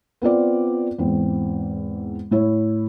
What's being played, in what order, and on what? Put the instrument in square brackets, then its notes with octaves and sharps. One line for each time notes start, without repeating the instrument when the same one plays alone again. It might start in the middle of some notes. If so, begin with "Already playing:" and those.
[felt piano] B3 C4 F4 D5
E2 G#2 C4
A2 E4 C#5